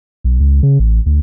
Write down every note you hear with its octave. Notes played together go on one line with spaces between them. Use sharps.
B1
C#2
C#3
A1
D2